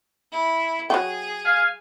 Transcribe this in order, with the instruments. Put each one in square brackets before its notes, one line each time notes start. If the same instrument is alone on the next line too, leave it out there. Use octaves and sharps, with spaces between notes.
[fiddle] E4
[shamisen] F#3 C#5 G5 [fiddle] G#4
[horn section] F5 G#5